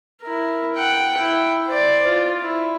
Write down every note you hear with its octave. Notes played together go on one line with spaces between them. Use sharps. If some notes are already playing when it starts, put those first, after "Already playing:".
E4 A#4
F#5 G5
E4 G5
C5 D5
F4
E4